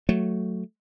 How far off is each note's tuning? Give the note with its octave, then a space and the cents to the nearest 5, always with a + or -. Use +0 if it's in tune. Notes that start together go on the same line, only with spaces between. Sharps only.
F#3 +0 A3 +0